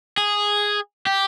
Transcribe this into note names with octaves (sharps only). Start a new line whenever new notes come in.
G#4
G4